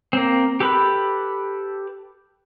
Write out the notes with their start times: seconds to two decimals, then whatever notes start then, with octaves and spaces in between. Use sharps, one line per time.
0.13 A#3 C4
0.60 G4 A4 B4 B5